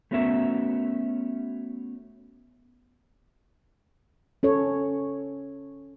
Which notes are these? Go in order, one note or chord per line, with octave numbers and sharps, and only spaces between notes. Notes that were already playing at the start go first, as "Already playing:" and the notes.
A3 B3 C#4 F#4 A#4 E5
C#4 A4 C#5